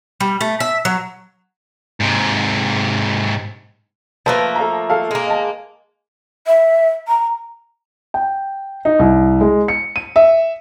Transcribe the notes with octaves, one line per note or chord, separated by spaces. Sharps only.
G3
A3
E5
F#3
G#2 C3
F3 A3 A#3 B4 A5
A4 F5 A#5
A4 F5
G#3 A#3
D#5 A5
E5
A#5
G5
D#4
C2
G#3
C#7
D#7
E5